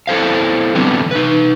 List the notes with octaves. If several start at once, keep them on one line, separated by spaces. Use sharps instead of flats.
E4 A4 C5 F5
D3 E3 F#3 G3 B3 C4
D#4 B4